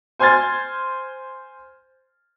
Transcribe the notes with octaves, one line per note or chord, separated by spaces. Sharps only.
C5 G#5 C6 F6 G#6 A6